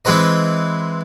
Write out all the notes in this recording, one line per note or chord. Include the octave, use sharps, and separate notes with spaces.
E3 G#3 C4 B4 D#5